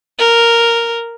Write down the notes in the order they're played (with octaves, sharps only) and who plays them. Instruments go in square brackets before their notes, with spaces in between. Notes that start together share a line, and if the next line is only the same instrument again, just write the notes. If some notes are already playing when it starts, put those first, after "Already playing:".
[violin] A#4